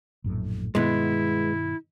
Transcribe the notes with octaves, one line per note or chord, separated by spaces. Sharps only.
A#1 F#2 A2
G2 B2 D#3 G#3 B3 E4